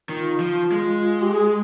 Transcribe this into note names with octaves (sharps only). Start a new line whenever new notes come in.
D#3 F4
F3
G#3
G4
G#4